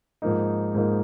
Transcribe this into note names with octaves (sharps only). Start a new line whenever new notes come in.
G#2 F3 A#3 D#4
G#2 F3 A#3 D#4